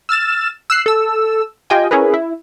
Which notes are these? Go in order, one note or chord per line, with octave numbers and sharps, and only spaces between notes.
E6 F6 A6 E7
E6 F#6 C7
A4 E6
F4 G4 D#5 G5 G#5
C#4 E4 G#4 A#4 B4
E4